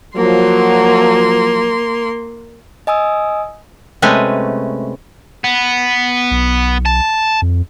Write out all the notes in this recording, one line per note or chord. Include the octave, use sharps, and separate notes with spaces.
F3 F#3 A#3 C6
D#5 G#5 D#6 E6
C3 G#3 A3 C#4 B4 G#5
B3
B1
A5
F2